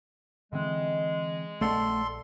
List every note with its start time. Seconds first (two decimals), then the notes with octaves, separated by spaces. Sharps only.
0.53 D3 E3 G#3 C4
1.61 A#1 A3 A4 D5 F#5 C6